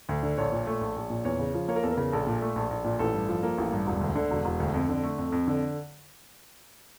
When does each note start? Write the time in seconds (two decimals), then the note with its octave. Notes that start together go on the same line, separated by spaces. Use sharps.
0.09 D2
0.23 D3
0.37 A#1 C#5
0.52 A#2
0.67 A3
0.81 A#1
0.96 A#1
1.10 A#2
1.25 E2 C#5
1.39 C#3
1.54 F3
1.68 A#3 C#5
1.76 A#4
1.83 E2 A4
1.91 A#4
1.97 C#3
2.12 A#1 A4
2.27 A#2
2.42 A3
2.56 A#1
2.71 A#1
2.84 A#2
2.99 A1 A4
3.14 G2
3.29 F3
3.43 A#3
3.58 A1
3.72 G2
3.87 E1
4.01 D2
4.15 D3
4.31 E1
4.45 E1
4.60 D2
4.74 F2
4.89 D3
5.03 A3
5.18 F2
5.32 F2
5.47 D3